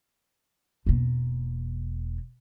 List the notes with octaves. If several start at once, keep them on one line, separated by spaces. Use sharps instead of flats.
E1 A#3